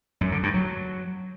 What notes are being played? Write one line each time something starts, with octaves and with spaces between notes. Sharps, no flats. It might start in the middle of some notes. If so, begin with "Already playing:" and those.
F#2
D3
G2
F#3